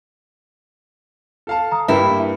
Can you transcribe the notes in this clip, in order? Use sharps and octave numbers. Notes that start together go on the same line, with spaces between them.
A4 F5 A5
A#5 D#6
G2 A#3 E4 G4 B4